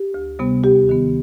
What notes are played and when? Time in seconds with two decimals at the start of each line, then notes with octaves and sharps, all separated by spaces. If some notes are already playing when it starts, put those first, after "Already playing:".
Already playing: G4
0.14 D2
0.39 C3 G3 B3
0.64 D#2 G4
0.89 D#3 B3